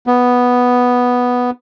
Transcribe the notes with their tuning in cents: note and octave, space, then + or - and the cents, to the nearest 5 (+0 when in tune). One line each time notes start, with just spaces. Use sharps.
B3 +0